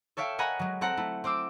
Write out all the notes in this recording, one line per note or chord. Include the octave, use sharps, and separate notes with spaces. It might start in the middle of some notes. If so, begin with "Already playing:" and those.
A4 C#5 E5 F5 G5
A#4 D#5 F#5 G#5 A#5 B5
F#3 G#3
C4 A4 C5 F#5 A#5
A3 E4
C4 C5 D6 E6